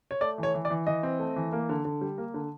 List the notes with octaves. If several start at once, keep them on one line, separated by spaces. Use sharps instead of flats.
C#5
A3 D5
E3
C#5
E3
D5
E3
E3 D#5
C4
A3
E3
A#3
D3
D3
G3
A#3
D3